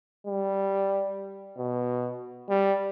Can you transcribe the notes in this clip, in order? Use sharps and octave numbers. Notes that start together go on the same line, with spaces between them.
G3
B2
G3